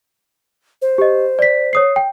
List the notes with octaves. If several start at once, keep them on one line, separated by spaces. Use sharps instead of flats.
C5
G4 D#5
D5 B6
C#5 D#6 C7
G5